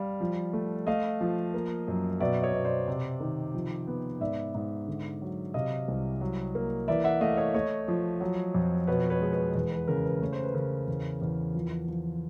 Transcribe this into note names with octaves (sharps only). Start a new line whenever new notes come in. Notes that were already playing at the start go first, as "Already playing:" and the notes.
Already playing: G3 F5
F3
A3
A3 D#5 F5
F3
A#3
F#2
B2 D5 E5
C#5 D#5
B2
C5 D5
C3
D#3
F3
B3
G#2 D5 E5
G#2
D3
F#3
C3 D#5 F5
C2
F#3
A#3
E3 D5 E5
E5 F#5
A3 D#5 F5
C#5 D#5
A3 C#5 D#5
F3
F#3
F2
B2 B4 C#5
B4 C#5
G#3
B4
E2 B4
B4
C#3 A#4
B4
A3 C#5
C5
B4
C#3 A#4 C5
E2
E2
F3
F3